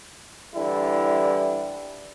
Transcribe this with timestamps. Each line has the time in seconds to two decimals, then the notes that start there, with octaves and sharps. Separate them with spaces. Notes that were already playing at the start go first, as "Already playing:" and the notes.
0.55 D3 E3 G3 E4